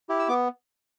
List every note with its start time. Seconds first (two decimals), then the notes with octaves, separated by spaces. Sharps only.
0.09 E4 G4
0.19 E6
0.29 B3 D6